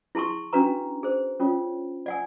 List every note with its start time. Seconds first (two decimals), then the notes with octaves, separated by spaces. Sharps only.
0.15 E4 G#4 A5 C6 C#6
0.53 C#4 D4 F#4 B4 A#5
1.03 G#4 C5
1.40 C#4 F4 C#5
2.06 D5 F#5 G#5